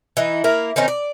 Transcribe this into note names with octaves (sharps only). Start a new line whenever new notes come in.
E3 D#4 E4
A#3 E4 A#4
D#3 C4 C#4 D#4
D5